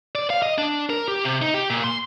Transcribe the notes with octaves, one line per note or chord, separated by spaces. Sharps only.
D5
F5
D#5
D4
A#4
G4
C3
D#4
G4
A#2
C6